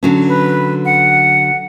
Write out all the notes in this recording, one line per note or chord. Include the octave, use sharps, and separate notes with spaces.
D3 F#3 C#4
B4
F#5